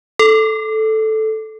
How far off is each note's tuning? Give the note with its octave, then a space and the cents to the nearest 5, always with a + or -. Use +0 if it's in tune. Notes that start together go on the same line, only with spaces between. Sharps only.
A4 -5